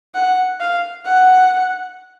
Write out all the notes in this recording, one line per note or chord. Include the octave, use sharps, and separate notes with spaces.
F#5
F5
F#5